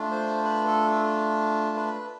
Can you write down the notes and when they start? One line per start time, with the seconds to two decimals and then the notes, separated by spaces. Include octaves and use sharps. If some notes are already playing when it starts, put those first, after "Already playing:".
Already playing: A3 D4 F4
0.11 C5
0.44 B4
0.66 A4
1.76 B4